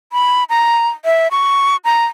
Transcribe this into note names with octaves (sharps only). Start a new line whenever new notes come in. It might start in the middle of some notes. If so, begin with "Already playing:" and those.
B5
A#5
E5
C#6
A#5